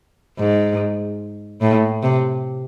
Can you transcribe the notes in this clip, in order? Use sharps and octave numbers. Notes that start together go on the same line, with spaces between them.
G#2
A2
C3